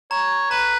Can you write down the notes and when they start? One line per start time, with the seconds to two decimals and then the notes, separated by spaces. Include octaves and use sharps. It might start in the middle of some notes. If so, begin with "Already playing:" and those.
0.11 C#5 A#5
0.50 B4 A#5